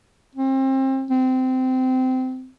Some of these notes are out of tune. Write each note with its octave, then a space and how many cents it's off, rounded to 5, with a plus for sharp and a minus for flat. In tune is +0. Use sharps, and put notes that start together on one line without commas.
C4 +30
C4 -20